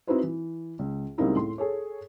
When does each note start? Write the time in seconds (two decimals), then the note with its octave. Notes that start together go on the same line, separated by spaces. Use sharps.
0.07 C4 D#4 E4 F#4 B4 C5
0.23 E3
0.79 C#2
1.18 C#2 G3 A#3 C4 D#4 E4
1.35 A2 C6
1.58 G#4 A4 C#5